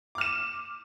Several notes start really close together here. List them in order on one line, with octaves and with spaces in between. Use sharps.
D6 F6 E7